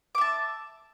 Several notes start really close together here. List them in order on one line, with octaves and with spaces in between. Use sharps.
D6 E5 A5